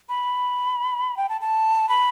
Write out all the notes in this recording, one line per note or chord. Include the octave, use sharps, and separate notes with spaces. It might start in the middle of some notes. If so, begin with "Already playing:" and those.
B5
G5
A5
A5
B5